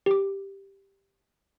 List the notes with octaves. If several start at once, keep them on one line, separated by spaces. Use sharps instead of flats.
G4 D6